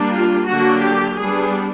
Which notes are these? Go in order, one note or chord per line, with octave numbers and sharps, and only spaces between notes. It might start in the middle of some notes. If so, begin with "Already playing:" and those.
Already playing: G3 A#3 D4
F4
D3 F#3 A#3 D4 F#4
G4
G3 B3 D4 G#4